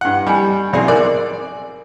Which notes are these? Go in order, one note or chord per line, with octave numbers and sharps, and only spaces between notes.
G2 F#5
G3 D#5 G#5
B1 C4 G#4 D5 E5
A#4 C5 D5 G#5